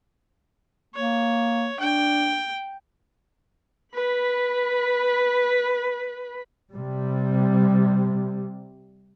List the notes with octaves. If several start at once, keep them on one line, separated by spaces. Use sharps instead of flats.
A#3 C#5
D4 G5
B4 B5
C3 G3